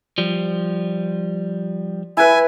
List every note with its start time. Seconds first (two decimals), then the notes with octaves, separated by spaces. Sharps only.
0.18 F3 G3
2.17 E4 B4 G#5